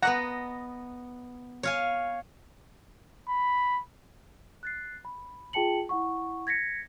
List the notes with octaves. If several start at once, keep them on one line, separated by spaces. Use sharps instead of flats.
B3 D#5 F#5 A#5
C#5 F5 G#5
B5
F#6 A6 C7
B5
F4 G#4 G5 A5 C#7 F#7
E4 F#5 C#6
G#6 A#6 B6 C#7